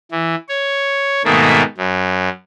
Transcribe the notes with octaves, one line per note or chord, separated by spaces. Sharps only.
E3
C#5
G#2 B2 D#3 A3 A#3
F#2